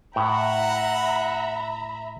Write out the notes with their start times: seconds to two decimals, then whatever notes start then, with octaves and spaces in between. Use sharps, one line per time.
0.16 A2 E5 F#5 A#5 B5